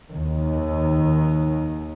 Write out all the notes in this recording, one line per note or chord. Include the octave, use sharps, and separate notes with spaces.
D#2 D#3